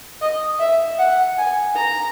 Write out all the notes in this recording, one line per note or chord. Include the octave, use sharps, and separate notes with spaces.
D#5
E5
F#5
G#5
A#5